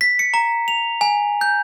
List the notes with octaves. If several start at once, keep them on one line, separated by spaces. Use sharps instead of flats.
B6
C#7
A#5
F7
G#5
G6